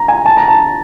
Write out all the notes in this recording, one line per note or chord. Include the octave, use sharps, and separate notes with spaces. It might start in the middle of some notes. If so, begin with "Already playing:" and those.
Already playing: A#5
G#5
A5
A#5
A5